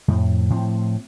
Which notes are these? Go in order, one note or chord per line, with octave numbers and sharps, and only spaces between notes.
F2 A2
A2 F3 C4